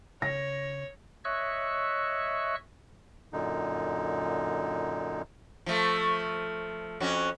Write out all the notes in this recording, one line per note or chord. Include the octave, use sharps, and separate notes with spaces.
C#3 C#5 A#6
C#5 D#5 E5 C#6 E6 F#6
F#2 A#2 D3 D#4
F3 A3
F2 C#4 F#4